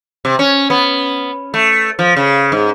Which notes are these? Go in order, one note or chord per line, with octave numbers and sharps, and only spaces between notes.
C3
C#4
B3
A3
F3
C#3
G#2